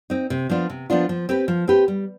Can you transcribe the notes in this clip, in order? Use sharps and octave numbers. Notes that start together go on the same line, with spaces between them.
C4 D#4
C3
F3 B3 D4 F4
C3
F3 B3 D4 F4
F3
C4 G4 B4
F3
C4 G4 B4
G3